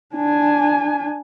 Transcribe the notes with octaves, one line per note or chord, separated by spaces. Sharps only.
D4 G#5